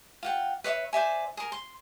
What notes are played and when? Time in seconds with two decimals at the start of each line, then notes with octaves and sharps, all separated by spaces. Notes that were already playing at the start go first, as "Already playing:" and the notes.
0.23 F4 F#5 G5
0.64 B4 C#5 D#5 E5
0.93 C5 D5 E5 G#5
1.37 G#4 A#4
1.52 C6